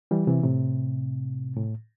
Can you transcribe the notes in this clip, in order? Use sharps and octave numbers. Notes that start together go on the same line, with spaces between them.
E3 G3
C3 E3
A2 C3
A2